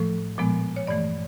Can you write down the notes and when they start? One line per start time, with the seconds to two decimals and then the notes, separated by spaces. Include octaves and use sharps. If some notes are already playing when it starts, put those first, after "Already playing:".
Already playing: A2 F3 A3 A4
0.38 A#2 F3 G#3 B3
0.76 C#5
0.87 G2 E3 A3 D5